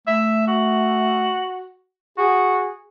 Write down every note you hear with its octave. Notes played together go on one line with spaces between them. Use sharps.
A3 E5
F#4
F#4 G#4